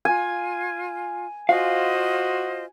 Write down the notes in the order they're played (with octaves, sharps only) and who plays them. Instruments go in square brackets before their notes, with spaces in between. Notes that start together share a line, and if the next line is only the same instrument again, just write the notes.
[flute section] F4 [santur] G#5
[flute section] F4 C5 D#5 [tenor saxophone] F#4 [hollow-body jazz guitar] F5